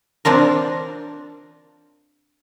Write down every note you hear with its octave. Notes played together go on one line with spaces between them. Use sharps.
C4 D4 F4 A#4